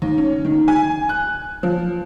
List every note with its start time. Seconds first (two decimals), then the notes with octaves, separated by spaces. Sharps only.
0.02 D#2
0.18 C#4
0.45 D#3
0.68 G#5
1.09 F#6
1.63 F3